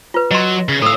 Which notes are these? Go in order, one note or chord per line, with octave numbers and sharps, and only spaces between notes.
F4 B4
F#3 D#5 C6
C#3
A2 A4 F5 E6